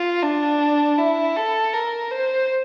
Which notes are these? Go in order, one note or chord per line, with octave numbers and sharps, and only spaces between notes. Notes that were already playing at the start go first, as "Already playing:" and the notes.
Already playing: F4
D4
E4
A4
A#4
C5